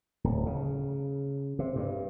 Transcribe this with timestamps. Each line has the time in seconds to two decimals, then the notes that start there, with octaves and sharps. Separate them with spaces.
0.24 D1
0.46 C#3
1.59 C3
1.76 G2